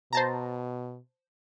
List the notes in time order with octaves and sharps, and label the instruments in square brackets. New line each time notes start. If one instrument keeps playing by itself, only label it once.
[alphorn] B2 [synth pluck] C5 A5 A#5